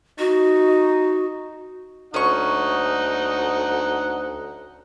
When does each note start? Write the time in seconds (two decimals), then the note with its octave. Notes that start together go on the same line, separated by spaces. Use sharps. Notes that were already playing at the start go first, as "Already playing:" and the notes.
0.19 D#4 F#4
2.14 D2 C#4 D#4 F#5 C#6